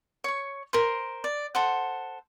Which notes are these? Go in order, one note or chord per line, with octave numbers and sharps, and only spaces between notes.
C#5 C#6
A#4 C5 C6
D5
A4 C5 F#5